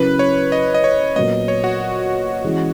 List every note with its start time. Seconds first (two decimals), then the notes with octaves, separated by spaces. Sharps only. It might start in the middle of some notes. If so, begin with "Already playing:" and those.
Already playing: C#3 F#3 C#4 E4 A#4 B4
0.19 C#5
0.52 D#5
0.74 D#5
0.84 C#5
1.16 A#2 F#3 B3 D#5
1.48 C#5
1.64 F#4
2.44 E3 G#3 C#4 E4 G#4